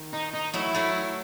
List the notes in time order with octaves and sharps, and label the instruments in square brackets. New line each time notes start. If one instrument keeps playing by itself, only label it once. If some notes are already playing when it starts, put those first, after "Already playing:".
Already playing: [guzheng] D#3
[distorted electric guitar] D#4
D#4
[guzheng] F#3 A3 [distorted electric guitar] E4
[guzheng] F#3 A3